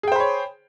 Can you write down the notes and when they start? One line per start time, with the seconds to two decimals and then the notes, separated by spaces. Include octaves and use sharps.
0.03 G#4
0.08 G5
0.12 C5
0.16 B5
0.20 C#5